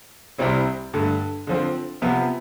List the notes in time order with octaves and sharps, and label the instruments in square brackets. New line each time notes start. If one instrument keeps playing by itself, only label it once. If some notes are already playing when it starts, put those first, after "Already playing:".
[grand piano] C2 C3 G3 C4 E4
G2 D3 A3
D3 F3 C4
C3 F3 B3